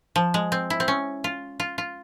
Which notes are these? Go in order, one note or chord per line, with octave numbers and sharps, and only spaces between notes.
F3
G#3
C4
E4
C4
C#4
F4
F4
F4